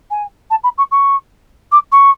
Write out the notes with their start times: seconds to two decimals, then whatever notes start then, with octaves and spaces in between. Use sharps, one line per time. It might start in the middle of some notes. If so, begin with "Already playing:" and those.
0.11 G#5
0.50 A5
0.64 B5
0.78 C#6
0.91 C#6
1.72 D6
1.92 C#6